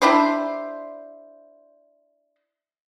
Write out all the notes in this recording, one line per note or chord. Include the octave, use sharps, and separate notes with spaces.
D4 E4 G4 C5